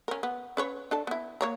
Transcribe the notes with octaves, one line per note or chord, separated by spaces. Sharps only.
C#4 A#4
B3
C#4 B4 C#5
D4 A4 A5
B3 E4
A#3 C#5 A#5